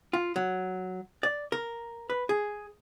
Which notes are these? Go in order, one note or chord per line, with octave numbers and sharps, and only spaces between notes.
F4
F#3
D5
A#4
B4
G#4